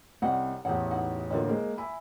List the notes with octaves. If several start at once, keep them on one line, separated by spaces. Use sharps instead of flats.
C2 C#4 D#5 F#5
A1 E2 C5 C#5 F#5
D#4 F#5
A1 D3 A#3 F4 F#4 D#5
G#3 A#3 C5
E4 G#5 B5